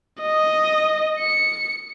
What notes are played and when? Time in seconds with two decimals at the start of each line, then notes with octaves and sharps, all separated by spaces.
0.22 D#5
1.20 C#7